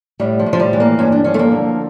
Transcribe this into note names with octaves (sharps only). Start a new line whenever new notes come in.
A2 G3
F3
A2
F3
G3
E3
A#3
G2 C#4
D4
F3 C#4
A3
A#3
D3